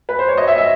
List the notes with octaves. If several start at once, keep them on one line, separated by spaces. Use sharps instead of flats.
B4
C5
C#5
D#5
E5
E5